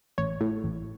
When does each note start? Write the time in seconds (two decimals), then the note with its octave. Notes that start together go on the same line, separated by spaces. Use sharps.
0.18 A1 C#5
0.41 A2
0.64 A1